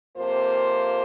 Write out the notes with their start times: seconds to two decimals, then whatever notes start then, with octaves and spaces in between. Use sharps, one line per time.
0.16 F2 C3 A#3 F4 C5